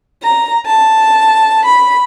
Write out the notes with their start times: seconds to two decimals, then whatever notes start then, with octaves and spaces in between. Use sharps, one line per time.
0.22 A#5
0.66 A5
1.65 B5